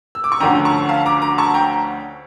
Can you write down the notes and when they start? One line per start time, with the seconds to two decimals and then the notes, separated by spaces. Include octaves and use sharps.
0.15 E6
0.24 D6
0.32 C#6
0.40 D2 D3 F3 C#4 G5 A#5
0.65 A5 C#6
0.89 F5 A5
1.06 A#5 D6
1.22 A#5 D6
1.38 A5 C#6
1.54 G5 A#5